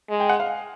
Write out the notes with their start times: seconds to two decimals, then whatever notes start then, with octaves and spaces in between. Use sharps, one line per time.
0.09 G#3
0.20 G5
0.29 F#5
0.40 F5